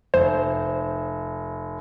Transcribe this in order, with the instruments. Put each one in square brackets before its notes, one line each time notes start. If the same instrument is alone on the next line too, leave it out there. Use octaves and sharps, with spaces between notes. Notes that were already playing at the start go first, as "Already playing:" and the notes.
[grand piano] F1 [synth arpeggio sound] C5